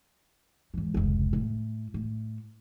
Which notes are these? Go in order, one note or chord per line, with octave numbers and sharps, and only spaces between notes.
G#2 E3
F1 C#2
A2
A2